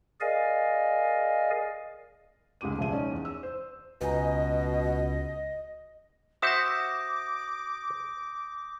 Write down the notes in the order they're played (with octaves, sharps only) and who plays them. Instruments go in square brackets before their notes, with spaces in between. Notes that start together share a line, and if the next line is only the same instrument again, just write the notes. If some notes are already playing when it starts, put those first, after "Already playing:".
[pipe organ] G#4 A#4 D5 D#5 F5 G#5
[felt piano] C#2 G#3 G4 D6 D#7
E1 F3 G#4 E5 D#7
C#4 D#4 D5
E2
E6
C5
[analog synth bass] C#2 [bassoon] B2 [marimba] B4 G#5 A#5 [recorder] D#5
[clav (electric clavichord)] F#4 C5 E5 [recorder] D6 [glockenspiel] D#6 G6 A#6